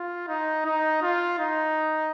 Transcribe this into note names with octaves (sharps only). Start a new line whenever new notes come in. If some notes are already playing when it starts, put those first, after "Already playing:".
Already playing: F4
D#4
D#4
F4
D#4